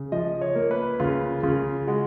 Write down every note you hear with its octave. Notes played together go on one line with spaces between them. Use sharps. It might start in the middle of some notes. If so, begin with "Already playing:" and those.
Already playing: C#3
F3 D#5
C#5
A#3
B4
C#3 F4
C#3 F4
G#3 F#4